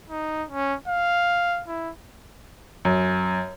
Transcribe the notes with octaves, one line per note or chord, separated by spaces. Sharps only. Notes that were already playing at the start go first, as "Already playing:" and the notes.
D#4
C#4
F5
E4
F#2